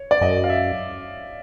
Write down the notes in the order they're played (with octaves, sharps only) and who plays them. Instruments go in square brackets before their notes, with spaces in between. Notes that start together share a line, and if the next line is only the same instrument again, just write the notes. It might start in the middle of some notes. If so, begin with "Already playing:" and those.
Already playing: [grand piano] C#5
D5
[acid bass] F#2 [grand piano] D#5
[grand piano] F5
E5